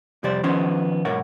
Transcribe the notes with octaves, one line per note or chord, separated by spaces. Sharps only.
F2 C3 G3 C5 D5
D#3 F3 B3 C#4 C5
B1 G#2 A#4 C#5 F#5